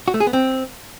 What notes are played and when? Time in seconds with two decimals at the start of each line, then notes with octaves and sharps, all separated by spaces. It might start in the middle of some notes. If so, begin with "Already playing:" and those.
0.08 F#4
0.14 A3
0.20 G#4
0.27 B3
0.33 C4